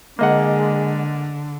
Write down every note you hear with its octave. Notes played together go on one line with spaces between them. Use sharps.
D3 G#3 A#3 D#5 F#5